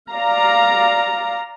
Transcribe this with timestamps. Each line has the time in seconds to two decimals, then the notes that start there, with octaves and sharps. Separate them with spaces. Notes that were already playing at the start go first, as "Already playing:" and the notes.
0.10 D5 F5 A#5